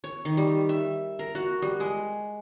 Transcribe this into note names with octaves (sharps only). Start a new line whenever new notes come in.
C#5
D#3
G3
E5
A#4
F#4
G3
G#3